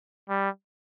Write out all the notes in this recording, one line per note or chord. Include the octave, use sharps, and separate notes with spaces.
G3